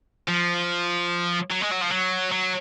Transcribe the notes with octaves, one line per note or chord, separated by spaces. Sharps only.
F3
F#3
G#3
F#3
F3
F#3
F#3